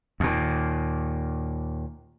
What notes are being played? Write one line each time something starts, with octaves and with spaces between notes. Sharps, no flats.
D#2 A#2